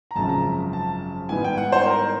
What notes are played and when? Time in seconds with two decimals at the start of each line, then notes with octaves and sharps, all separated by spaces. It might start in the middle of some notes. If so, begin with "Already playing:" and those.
0.11 A#5
0.15 G#1 F#2 C#3 F3 A5
0.29 A#5
0.73 A5
1.29 G#2 D#3 G3 B3 E4 G#5
1.44 G5
1.57 F#5
1.72 C5
1.86 A#4